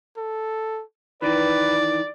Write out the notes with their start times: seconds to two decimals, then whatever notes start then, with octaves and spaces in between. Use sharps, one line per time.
0.17 A4
1.22 D#3 E3 B4 D5